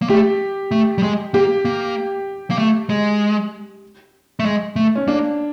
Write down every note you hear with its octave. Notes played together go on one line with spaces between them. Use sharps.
A#3
A3 G4
A3
G3
G#3
A#3 G4
A#3
A#3
A3
G#3
A3
G#3
A3
C#4
A#3 D4